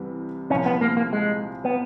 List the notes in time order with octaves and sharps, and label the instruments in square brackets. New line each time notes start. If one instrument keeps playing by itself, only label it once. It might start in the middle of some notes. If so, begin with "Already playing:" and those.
Already playing: [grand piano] C2 C3 E3 G3
[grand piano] C2 A#2 F3 [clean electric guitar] C#4
[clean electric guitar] B3
A#3
A#3
G#3
B3